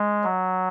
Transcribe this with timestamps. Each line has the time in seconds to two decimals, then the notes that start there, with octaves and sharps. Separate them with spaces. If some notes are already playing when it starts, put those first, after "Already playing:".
Already playing: G#3
0.24 F#3